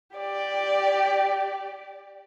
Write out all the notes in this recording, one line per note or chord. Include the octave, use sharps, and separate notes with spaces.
G4 D5